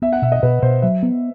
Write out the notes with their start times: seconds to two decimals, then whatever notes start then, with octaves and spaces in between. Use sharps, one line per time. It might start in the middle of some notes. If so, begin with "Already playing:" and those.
0.02 B3 E5
0.13 F#5
0.22 B2 E5
0.32 D#5
0.43 B2 B4
0.62 B2 C5
0.82 F#3 E5
1.03 B3